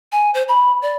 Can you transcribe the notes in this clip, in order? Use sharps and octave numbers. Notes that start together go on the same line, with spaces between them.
G#5
C5
B5
D5